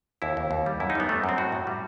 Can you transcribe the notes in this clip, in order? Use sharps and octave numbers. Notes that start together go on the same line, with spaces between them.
D#2 E4
D#2
D#2
G3
F#2 E4
D#4
G3 B3
G3 A3
F#2
C4
A2 F#4
A2
G3